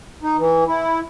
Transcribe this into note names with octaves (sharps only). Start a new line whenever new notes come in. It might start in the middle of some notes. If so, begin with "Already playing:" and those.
D#4
E3
E4